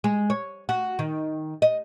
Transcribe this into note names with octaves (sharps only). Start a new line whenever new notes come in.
G#3
C#5
F#4
D#3
D#5